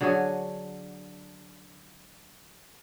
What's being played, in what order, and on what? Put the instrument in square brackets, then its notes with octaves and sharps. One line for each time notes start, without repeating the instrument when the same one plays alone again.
[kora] D3 F#3 G#4 C#5